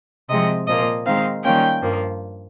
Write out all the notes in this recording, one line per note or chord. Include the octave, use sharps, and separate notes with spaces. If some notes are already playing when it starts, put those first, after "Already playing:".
C3 F3 G#3 C4 D#5
A#2 F3 A#3 D#5
D#3 G#3 C4 D#4 F5
D#3 G3 A#3 C#4 F4 G5
G2 F3 A#3